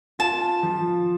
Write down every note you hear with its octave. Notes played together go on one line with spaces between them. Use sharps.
F4 A5
F3